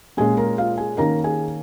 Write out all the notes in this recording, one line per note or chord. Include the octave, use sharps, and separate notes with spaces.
A#2 G#3 C#4 G#4 G#5
A#4 A#5
F4 F5
G#4 G#5
D#3 A#3 C#4 A#4 A#5
G#4 G#5